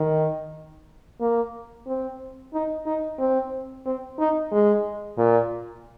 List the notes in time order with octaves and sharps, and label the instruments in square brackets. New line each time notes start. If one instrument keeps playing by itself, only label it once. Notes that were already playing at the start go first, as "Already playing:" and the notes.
Already playing: [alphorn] D#3
A#3
C4
D#4
D#4
C4
C4
D#4
G#3
A#2